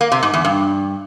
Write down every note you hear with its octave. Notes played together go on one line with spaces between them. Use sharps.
A#3
C3
G#2
E2
G2